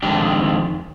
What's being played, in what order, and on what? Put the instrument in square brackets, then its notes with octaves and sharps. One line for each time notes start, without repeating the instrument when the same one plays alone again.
[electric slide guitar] F2 D#3 G#3 D4 G4